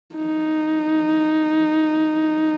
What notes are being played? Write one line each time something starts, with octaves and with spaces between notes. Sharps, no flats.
D#4